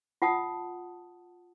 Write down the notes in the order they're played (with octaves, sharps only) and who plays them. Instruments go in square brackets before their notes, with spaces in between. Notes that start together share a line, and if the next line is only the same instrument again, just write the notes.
[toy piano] F4 F#5 A5 D#6